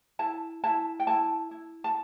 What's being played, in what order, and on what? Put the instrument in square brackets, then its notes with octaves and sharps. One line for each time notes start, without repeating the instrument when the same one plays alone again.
[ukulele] E4 A5
E4 A5
G5
E4 A5
E4
A5